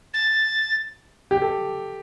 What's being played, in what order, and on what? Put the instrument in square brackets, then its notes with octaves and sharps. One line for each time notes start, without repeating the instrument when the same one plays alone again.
[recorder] A6
[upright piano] G4
A4